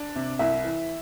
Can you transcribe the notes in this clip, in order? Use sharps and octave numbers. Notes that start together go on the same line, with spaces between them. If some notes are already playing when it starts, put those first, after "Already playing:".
Already playing: D4
C3
C2 E4 E5
E3